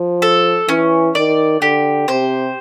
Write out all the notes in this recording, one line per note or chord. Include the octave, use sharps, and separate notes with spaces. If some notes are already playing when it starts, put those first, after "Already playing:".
Already playing: F3
A4
E3 C#4
D#3 D5
D3 G4
C3 C5